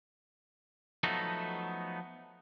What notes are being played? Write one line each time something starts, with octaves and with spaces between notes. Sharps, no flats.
F3 F#3 A3 B3 D#4 A4